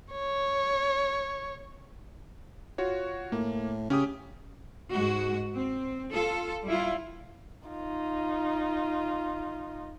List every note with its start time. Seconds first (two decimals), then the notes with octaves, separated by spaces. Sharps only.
0.12 C#5
2.78 F4 F#4 C#5
3.32 A2 A#3
3.90 C#3 C#4 G4 D#6
4.91 G#2 G#3 F#4
5.57 C4
6.12 F4 A4
6.66 G3 E4 F4
7.68 D#4 F4